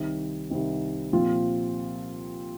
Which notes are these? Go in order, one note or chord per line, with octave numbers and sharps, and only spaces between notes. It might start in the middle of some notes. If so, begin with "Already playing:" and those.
Already playing: C2 C3 D#3 C4 D#4
C2 C3 D#3 C4 D#4
A#2 F3 C4 F4